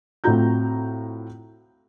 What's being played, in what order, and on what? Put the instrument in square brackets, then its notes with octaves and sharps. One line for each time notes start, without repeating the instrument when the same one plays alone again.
[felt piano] A2 C4 F4 F#4 A#5 G6